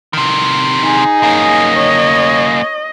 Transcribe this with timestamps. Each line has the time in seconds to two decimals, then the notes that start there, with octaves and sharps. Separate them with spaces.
0.13 C3 D#3
0.82 D#4 G#4
1.23 A#3 C#4 D#5
1.75 C#5